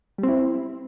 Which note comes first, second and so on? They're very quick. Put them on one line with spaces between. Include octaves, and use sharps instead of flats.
G3 C4 E4